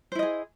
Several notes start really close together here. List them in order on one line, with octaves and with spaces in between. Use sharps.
C5 E4 D#5 G#4